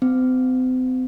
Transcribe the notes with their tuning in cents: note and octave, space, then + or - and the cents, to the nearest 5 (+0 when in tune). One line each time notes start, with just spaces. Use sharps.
C4 -40